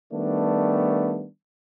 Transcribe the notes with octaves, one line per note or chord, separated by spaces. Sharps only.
D#3 G3 A3 B3 D4